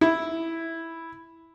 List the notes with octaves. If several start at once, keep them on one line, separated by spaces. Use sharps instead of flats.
E4